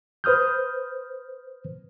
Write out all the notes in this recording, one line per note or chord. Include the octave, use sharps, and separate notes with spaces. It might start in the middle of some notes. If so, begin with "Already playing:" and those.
B4 C5 D#6 F6 G6